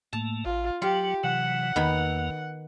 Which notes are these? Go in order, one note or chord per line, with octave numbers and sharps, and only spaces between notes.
A2 A3 A#3 A5
A1 F4
F#3 F4 G4
C3 E3 F#3 F#5
E2 D#3 A#3 B3 B5